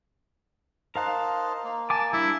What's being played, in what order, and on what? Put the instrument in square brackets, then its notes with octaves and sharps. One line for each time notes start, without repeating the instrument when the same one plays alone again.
[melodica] D#4 C5 A5 [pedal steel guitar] A#4 F5 F#6
[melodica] A#3
[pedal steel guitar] G#5 D6 [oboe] A5
[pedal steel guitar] G3 D4 [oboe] E4